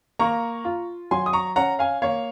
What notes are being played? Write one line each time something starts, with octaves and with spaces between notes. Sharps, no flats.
A#3 A#5 C#6
F4
F#3 G#5 C6
D#6
A#5 C#6
C#4 F#5 A#5
F5 G#5
A#3 C#5 F5